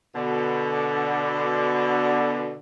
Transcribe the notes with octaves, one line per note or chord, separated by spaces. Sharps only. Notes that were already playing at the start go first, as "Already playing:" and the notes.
B2 D3